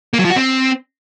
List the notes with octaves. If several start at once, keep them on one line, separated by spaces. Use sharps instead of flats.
A#3
F#3
F3
F#4
C4